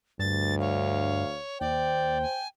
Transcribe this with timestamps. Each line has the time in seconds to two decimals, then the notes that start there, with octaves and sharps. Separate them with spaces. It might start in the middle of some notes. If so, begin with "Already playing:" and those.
0.19 D2 G2 A6
0.60 C#5 F5
1.61 D#2 C5 D5 G5
2.22 G#5